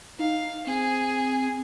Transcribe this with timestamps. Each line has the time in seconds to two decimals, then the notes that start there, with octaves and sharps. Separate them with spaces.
0.19 D#4 F5
0.67 C4 G#4